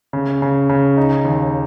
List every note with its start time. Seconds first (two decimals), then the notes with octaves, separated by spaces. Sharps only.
0.13 C#3
0.42 C#3
0.69 C#3
0.97 D#4
1.25 D#2